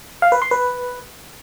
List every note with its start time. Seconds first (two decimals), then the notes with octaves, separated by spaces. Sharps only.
0.22 F5
0.32 B4
0.42 C6
0.51 B4